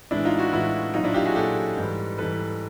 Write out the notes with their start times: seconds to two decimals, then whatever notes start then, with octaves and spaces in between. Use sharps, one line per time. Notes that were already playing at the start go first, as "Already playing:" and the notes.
0.11 A2 E3 G#3 D4 E4
0.25 D#4 F4
0.39 E4 F#4
0.52 A2 E3 G#3 E4 F#4
0.94 A#2 F#3 D#4 F4
1.04 D4 E4
1.14 F4 G4
1.25 F#4 G#4
1.36 A#2 F#3 G4 A4
1.77 G#2 E3 G3
2.18 G#2 E3 G3 A4 B4